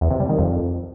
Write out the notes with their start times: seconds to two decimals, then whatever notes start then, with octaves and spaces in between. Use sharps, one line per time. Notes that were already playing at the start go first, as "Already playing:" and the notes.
0.01 E2
0.11 C3
0.20 G3
0.29 D#3
0.39 F2